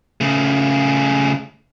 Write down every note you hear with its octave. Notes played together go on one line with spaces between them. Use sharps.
C#3 A3